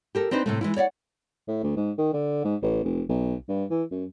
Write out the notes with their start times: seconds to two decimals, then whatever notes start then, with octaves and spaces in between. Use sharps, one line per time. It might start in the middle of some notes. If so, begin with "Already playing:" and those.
0.15 G4 A4 A#4
0.31 C4 D4 D#4 B4 C5
0.46 A2 C3 A3
0.61 E3 G#3 E4
0.76 C#5 D5 E5 F#5
1.48 A2
1.63 D2
1.76 G#2
1.98 D#3
2.13 D3
2.44 G#2
2.62 A1
2.84 F1
3.09 B1
3.49 G2
3.70 E3
3.91 F#2